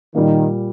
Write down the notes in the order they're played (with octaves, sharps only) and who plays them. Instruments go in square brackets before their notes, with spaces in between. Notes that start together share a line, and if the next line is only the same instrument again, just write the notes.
[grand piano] A#2 G3 A#3 [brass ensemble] D#3